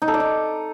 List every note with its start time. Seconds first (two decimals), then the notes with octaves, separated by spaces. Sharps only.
0.02 D#4
0.08 A4
0.14 D5
0.20 D#4